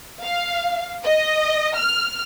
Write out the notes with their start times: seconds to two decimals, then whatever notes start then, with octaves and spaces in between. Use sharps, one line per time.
0.23 F5
1.04 D#5
1.76 F6